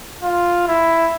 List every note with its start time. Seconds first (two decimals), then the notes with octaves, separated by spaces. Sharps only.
0.23 F4
0.68 E4